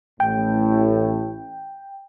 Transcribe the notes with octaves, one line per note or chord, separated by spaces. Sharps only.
A1 A2 G5